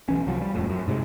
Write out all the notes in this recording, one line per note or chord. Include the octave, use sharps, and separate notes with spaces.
B1 E3 C#4
C2 F3 F#3
G3
D#1 F2 A2
F#2
G#2 C3 D#3 G#3